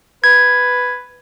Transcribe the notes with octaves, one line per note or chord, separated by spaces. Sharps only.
B4 G#6